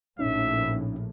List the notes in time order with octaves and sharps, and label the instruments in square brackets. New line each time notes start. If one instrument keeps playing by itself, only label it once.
[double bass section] A#1 A2 [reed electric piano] C#4 D#4 [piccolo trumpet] E5